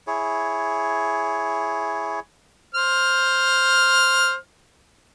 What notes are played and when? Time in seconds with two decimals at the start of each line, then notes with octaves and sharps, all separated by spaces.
0.07 E4 G#4 C#5
2.75 C5 F6